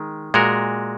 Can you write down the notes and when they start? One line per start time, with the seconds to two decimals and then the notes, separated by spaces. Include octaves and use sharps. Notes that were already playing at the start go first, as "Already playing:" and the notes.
Already playing: D#3 G#3
0.34 A#2 G#3 F#4 A#4